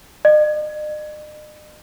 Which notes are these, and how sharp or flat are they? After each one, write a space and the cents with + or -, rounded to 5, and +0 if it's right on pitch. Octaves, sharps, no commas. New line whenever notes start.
D#5 -45